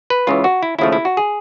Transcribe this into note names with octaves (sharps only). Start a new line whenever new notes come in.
B4
C#2 C#3 E3 F4
F#4
E4
D#2 C#3 F3 A3 E4
E4
F#4
G#4